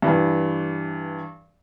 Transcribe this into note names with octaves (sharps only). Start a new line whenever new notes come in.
G2 E3